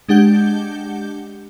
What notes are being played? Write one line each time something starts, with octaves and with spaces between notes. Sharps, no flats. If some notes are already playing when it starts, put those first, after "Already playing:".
G#3 D4 G4 F#5 G6 G7